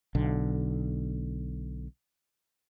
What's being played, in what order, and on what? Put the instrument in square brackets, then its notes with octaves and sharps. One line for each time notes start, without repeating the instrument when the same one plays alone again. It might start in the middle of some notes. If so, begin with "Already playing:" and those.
[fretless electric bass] B1 D3